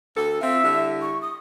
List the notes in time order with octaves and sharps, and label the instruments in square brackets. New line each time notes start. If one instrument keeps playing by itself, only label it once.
[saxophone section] D2 A4
[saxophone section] C4 F4 [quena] E5
[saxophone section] D3 G3 E4
[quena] C#6
D#6